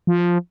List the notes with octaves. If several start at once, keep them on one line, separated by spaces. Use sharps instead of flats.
F3